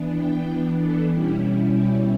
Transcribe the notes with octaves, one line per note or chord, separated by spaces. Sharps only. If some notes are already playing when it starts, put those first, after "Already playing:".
Already playing: E3 B3 D4
G5
A4
B2 G3 C#4 E4 G4
G4